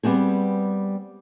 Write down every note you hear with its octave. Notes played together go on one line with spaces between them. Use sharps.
G3 B3 C4 G#4